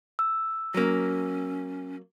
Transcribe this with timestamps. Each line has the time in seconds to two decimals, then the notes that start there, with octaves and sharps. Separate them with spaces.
0.19 E6
0.74 F#3 A#3 C#4